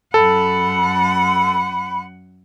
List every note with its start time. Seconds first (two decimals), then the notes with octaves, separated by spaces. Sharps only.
0.14 F#2 A4 F#5 B5